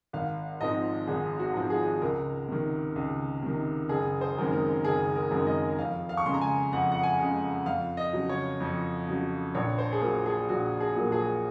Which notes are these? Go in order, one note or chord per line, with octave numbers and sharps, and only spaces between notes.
G#1 F5
G#2 F3 C4 D#5
G#1 G#4
F#4
G#2 F3 C4
G#4
C#2 A#4
C3 D#3
C#2
C3 D#3
F#1 G#4
C5
F#2 D#3 G#3 C4
A#4
F#1 G#4
A#4
F#2 D#3 G#3 C4
D#5
F2 F5
F5
C#6
C#3 G#3 C6
A#5
G#5
F2 F#5
F#5
G#5
C#3 G#3
F2 F5
D#5
C#3 F#3
C#5
F2
C#3 F#3
A#1 C#5
C5
G#4
A#2 F#3 A#3 A#4
G#4
A#1 F#4
G#4
A#2 F#3 A#3
G#4